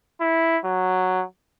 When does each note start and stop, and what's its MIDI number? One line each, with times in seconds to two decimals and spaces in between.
0.21 0.58 64
0.64 1.24 54